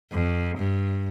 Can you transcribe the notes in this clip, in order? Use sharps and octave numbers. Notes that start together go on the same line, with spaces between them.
F2
G2